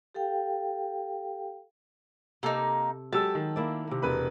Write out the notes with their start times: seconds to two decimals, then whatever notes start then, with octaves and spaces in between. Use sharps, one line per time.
0.15 G4 A4 F5 G5
2.43 C3 A#3 D#4 A4
3.13 F#3 G#3 G4 A4 A5 E6
3.35 D#3
3.56 A#3 E4 D5
3.87 C3 A#3
4.02 E1 B4 B5